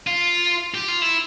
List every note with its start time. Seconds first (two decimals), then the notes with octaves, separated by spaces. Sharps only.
0.07 F4
0.74 G4
0.88 F4
1.02 E4